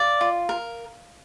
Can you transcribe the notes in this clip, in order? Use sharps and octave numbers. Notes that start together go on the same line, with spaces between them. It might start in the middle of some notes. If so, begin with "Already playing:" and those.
Already playing: D5 F5
F4
A#4